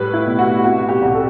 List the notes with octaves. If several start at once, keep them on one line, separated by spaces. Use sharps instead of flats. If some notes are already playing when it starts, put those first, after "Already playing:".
Already playing: A2 G3 B4
E4
B2
F#4
C3 F#4
G4
C2 G4
A4